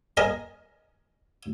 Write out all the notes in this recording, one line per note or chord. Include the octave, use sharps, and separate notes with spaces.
A#4 D#5 G#5 A#5